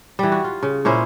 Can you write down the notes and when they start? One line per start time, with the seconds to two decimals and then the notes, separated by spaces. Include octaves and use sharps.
0.19 E3 G3
0.32 F#4
0.44 F4
0.63 C#3
0.85 A#2 C#4 E4 C5